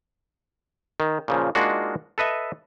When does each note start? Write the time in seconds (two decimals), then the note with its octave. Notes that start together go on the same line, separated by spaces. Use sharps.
1.00 D#3
1.28 A#2 C#3 F3
1.55 G#3 A#3 D4 D#4 F4 F#4
2.18 A4 B4 D#5 E5